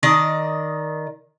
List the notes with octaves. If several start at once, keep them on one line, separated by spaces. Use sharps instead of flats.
D#3 D5 D#5